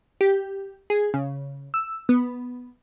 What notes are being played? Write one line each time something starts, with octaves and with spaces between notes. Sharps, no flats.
G4
G#4
C#3
E6
B3